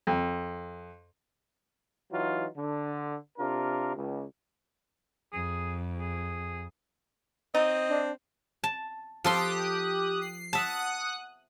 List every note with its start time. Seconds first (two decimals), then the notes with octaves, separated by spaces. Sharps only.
0.07 F2
2.12 E3 F#3 D#4 F4
2.56 D3
3.38 C3 D4 F4 A#4
3.96 C#2
5.33 F2 G#4
5.99 G#4
7.54 C4 D#4 D#5
7.88 D4
8.64 A5
9.24 F3 G4 A4 C6 D#6 F#6
10.22 C7
10.53 E5 F#5 A5 D#6 F#6